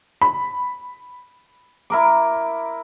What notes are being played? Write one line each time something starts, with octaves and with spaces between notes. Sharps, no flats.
B5
E4 A#4 D6